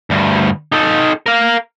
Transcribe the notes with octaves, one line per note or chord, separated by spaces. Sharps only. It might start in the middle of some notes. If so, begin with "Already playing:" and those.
D2 G2
D#4 A4
A#4 F5